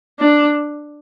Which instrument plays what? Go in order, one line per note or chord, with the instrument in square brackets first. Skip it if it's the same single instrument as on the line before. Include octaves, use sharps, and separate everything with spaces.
[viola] D4